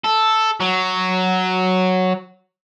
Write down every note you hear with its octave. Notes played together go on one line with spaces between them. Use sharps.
A4
F#3